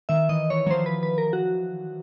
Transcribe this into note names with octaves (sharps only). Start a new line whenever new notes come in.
D#3 E5
E3 D#5
E3 C#5
F#3
F3 C5
B4
B4
A#4
F#4